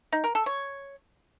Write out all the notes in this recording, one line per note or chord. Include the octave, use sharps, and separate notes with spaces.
D#4
A#4
A4
C#5